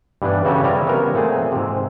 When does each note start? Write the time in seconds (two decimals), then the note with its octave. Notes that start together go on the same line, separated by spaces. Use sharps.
0.22 G2 E3 G3 B3 D4
0.45 C#3 F#4 G4 A4 G#5
0.64 C3 G3 E4 F4 C#5 A#5
0.87 B3 C#4 F#4 A#4 C#5
1.14 A#2 A3 C4 G#4
1.52 G#2 C3